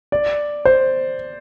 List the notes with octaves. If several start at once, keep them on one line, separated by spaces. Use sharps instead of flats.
D5
C5